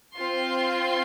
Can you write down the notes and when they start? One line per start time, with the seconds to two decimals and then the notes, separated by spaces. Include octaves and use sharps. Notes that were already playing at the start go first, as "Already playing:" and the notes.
0.18 C4 F4 C6